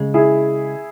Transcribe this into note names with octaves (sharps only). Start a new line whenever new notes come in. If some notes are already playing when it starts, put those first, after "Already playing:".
Already playing: C#3 G#3
E4 G#4